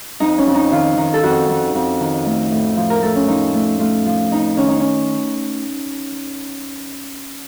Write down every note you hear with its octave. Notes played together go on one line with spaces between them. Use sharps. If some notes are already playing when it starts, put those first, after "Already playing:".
F2 D#4
C#4
F2
D#4
D#3 F4
D#3
A4
F2 F#4
F2
F2
D#3
A3
A2
F3
A#4
A3 A4
C#4
F3 D#4
A3
A3 F4
F3
F2 D#4
D#3 C#4
D#4
C#4